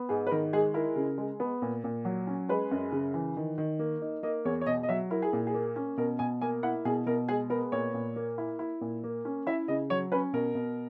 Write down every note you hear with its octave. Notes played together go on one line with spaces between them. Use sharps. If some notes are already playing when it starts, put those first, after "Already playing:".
Already playing: B3
G#2 G#4
B4
D#3 A#4
G#3 G#4
E4 A#4
C#3
G#3
B3
A#2
A#2
F#3
C#4
G#3 B4
F#2
C#3
E3
D#3
D#3
A#3
D#4
A#3 D#5
E2 C#5
C#5
B2 D#5
D#5
F#3 E5
E4 A#4
G#4
A#2
G#4
A#3
C#4
B2 A#4
B2 G#5
A#3 G#5
E4 F#5
B2 G#4
B2 A#4
G#3 G#4
B3 A#4
A#2 C#5
A#2
A#3
E4
E4
A#2
A#3
C#4
E4 E5
C#3 D#5
F#3 C#5
C#4 B4
B2 A#4
B2